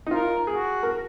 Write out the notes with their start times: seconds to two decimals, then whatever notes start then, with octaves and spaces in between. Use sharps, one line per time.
0.06 D#4
0.11 F4 A#4
0.47 F#4 G#4
0.83 A#4